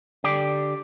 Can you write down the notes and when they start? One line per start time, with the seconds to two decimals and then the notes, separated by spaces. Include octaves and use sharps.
0.24 D3 G4 D5